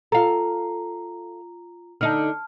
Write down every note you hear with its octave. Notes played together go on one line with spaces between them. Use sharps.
F4 A4 F5 A#5
D3 D#4 A5 F6